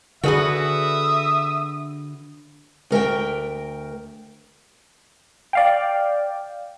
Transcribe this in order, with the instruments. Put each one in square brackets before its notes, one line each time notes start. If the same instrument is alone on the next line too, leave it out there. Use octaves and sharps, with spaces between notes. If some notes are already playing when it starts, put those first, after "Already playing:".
[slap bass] D3 [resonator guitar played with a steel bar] F#4 G#4 B4 [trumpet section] E5 D#6
[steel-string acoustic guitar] D2 A#4 E5 G5
[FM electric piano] D5 F5 G5